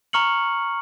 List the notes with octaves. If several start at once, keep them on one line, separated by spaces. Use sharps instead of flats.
A#5 C#6 F6 C#7 F#7